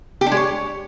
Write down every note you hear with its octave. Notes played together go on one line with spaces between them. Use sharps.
G4
D4
G#3
C#5